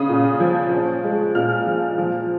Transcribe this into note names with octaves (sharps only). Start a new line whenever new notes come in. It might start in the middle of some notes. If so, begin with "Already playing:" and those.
Already playing: C#3 D#6
A#2
F3
C#4
G#3
A#2 F6
F3
F3